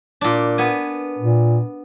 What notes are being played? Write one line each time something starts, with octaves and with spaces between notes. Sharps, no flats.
A#2 D4
B3 G#5
A#2